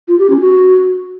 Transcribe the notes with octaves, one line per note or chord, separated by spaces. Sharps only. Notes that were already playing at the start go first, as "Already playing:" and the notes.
F4
G4
C#4
F#4